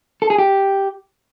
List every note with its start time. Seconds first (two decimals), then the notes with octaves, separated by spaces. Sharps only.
0.22 A4
0.30 G#4
0.38 G4